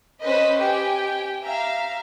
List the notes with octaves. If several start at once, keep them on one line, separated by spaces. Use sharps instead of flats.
C#4 B4 C5 D#5 B5
G4 G5 G#5
E5 F5 A#5